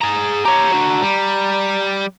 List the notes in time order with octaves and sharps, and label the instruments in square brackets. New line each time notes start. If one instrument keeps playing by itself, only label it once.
[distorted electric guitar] G#4 A#5
[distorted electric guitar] G4 C#5 [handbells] A#5
[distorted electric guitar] D4 F#4
G3